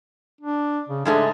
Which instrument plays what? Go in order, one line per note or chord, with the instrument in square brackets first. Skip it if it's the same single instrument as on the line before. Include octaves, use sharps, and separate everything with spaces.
[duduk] D4
C#3
[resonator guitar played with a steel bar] G#2 G#3 A3 [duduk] D4